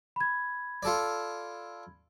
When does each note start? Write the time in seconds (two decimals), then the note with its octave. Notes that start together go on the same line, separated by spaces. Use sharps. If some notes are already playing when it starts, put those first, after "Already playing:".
0.16 B5 G#6
0.83 F4 A4 D5